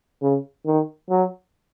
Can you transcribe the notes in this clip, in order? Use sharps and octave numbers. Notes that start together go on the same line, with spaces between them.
C#3
D#3
F#3